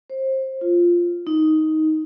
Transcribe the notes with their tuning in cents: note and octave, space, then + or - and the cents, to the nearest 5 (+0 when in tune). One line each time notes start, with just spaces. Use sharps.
C5 +25
F4 -5
D#4 +10